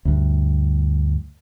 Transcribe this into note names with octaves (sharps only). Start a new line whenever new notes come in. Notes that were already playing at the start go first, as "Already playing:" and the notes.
D2 G2